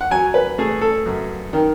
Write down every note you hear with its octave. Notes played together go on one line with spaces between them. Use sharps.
F#5
F#3 G#5
B4
A3 G#4
A4
F#2
D#3